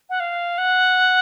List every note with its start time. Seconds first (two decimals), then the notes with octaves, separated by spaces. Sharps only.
0.10 F#5
0.20 F5
0.58 F#5